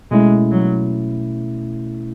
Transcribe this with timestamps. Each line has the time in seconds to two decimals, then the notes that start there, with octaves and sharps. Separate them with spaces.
0.11 B2 G#3 A3 C#4 E4
0.51 F#3